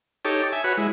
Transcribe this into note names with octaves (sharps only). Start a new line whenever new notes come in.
D#4 G4 A4 C#5 D6
E5 G#5
F#4 B4 C#5
G#3 E4